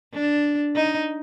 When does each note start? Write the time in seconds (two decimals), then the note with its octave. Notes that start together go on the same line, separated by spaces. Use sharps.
0.13 D4
0.76 D#4